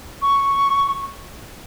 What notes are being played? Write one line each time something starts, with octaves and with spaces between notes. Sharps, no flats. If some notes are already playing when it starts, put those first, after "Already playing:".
C#6